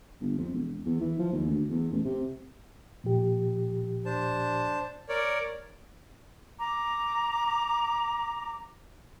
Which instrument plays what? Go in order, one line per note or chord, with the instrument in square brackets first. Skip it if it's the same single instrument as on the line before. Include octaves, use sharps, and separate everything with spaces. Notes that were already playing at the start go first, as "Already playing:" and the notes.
[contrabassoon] G1
F2
E1
E2
E3
F3
D#2
D2
E2
A1
C3
[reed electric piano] A#2 F3 G4
[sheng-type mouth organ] D4 C5 A5
A#4 C#5 D5
[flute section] A#5 D6